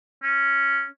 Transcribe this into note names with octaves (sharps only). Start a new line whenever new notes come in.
C#4